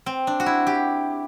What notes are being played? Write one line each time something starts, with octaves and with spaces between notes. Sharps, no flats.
C4
D4
F#4
E4
G4